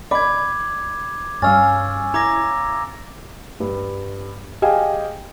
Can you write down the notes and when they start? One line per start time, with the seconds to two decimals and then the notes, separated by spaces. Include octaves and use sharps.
0.11 D5 B5 D6 G#6
1.42 G2 G3 C#4 F5 E6 A6
2.14 E4 A#5 D6 G#6 A#6
3.60 G2
4.62 G4 G#4 D#5 F5 G5 G#5